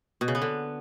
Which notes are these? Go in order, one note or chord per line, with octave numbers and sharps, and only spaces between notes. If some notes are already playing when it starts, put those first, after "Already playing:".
B2
C#3
B3
D3